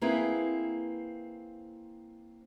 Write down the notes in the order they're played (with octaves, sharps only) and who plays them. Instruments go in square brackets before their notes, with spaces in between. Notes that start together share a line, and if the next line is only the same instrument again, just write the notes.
[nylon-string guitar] A#3 C4 E4 G#4 B4